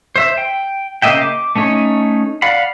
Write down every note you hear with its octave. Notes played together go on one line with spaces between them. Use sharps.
C5 E5
G5
C#3 A#3 D#5 E5 G5
D6
A3 C#4 D#4 C#5
D5 F5 F#5 B5